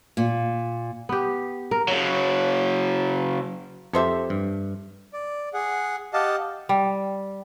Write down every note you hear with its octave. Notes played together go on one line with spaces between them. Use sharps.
A#2
B3 G4
A#4
C#3 F#3
F2 G4 A4 C5 E5
G2
D5
G#4 F#5
G4 D#5 F5 F#5 A5
G3